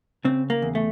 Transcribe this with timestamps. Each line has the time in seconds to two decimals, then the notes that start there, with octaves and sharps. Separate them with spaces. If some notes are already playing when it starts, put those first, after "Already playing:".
0.25 C#3 C4
0.50 A#3
0.62 E2
0.75 A3